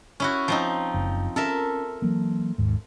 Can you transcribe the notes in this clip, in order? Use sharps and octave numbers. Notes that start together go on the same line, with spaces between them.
C#4 E4 F#4
F3 C4 D#4
F#1
C#4 A4 A#4 E5
E3 F#3 A#3
G#1 D#2 G#2